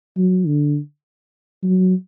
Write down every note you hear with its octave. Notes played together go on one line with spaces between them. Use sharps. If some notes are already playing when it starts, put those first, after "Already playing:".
F#3
D3
F#3